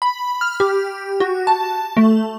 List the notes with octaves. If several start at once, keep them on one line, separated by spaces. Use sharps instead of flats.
B5
F6
G4
F#4
A5
A3